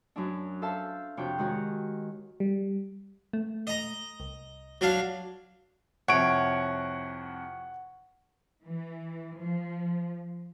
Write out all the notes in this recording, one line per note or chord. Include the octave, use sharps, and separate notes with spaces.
F#2 F#3 D4
A4 C5 E5 F5 A5
F2 C3 D4 F#4 C#5 G5
D#3 G#3 F#4 G4 C#5
G3
A3
D#5 A#5
C2
F#3 D4 F5
C2 F2 C#5 F#5 D7
E3
F3